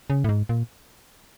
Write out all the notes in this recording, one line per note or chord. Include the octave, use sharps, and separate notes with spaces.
C#3
A2
G#2
A#2